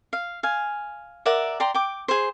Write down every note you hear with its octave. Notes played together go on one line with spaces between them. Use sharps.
F5
F5 G#5
A#4 D5 E5 F#5
D5 G5 A#5 C6
G5 D6
G#4 C5